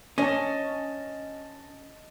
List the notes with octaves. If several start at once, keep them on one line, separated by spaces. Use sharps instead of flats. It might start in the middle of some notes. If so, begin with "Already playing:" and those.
C#4 D#5 A5